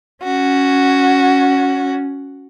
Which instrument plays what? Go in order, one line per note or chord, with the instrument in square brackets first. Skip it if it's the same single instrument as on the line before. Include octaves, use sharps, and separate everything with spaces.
[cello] C#4 [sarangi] F#4